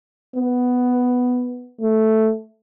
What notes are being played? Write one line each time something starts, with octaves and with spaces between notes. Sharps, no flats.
B3
A3